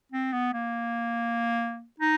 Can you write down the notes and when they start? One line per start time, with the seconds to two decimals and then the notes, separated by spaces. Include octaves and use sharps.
0.12 C4
0.33 B3
0.54 A#3
2.00 D#4